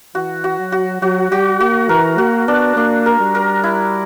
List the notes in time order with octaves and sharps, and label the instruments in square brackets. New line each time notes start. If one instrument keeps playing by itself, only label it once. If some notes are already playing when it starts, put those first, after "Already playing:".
[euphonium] E3 [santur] F#4
[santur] F#4
[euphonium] F#3
[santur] F#4
[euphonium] F#3 [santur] F#4
[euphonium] G3 [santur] F#4
[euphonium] A#3 [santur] F#4
[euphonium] E3 [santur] A#4
[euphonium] A#3 [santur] F#4
[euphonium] B3 [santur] D4
[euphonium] A#3 [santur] D4
[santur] A#4
[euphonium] G3
[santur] A#4
E4